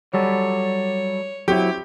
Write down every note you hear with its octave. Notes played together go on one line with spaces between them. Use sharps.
F#3 G3 A4 C#5
F#3 C4 E4 G4